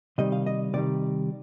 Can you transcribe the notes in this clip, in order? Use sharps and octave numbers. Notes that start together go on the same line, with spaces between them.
C3 D#3 G3 D#5
F5
D#5
C3 D#3 G3 D5